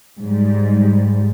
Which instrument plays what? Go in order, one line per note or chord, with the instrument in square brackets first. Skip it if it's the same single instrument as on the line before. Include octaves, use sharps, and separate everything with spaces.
[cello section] G#2 G3